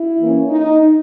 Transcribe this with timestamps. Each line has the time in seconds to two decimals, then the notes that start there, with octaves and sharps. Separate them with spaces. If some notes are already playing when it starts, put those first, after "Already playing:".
Already playing: E4
0.20 E3 A#3 C#4
0.50 D#4